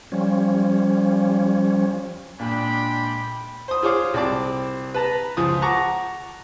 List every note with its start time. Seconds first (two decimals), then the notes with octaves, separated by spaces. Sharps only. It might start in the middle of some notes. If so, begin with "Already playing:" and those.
0.12 F3 G3 C#4
2.40 A#2 G#3 D4 G5 B5
3.68 C5 D#6
3.82 F4 G#4 C5 C#5 F5 D6
4.14 C2 C4 D5 A5 D6
4.94 B4 A5 A#5
5.37 C#2 F3 F4 D#6
5.62 F#5 A5 A#5 C#6 D6